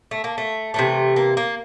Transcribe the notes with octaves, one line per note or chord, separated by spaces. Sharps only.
A3
A#3
A3
C3 E3 A3
A#3
A#3